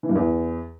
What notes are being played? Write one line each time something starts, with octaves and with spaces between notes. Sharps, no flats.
E3
G2
E2